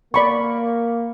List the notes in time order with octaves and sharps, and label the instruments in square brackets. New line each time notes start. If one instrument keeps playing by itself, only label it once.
[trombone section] A#3 [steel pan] D5 B5 C#6